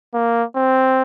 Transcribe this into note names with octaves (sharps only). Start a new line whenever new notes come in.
A#3
C4